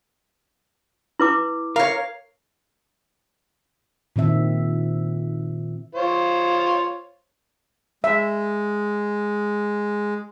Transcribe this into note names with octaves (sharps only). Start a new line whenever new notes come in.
E4 B4 D6
A#4 C#5 F5
A#2 D#3 C4 E5
F4 C5 C#5
G#3 E5